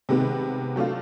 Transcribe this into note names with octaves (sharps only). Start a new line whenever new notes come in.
C3 D#3 G#3 B3
F#3 A3 D4 F4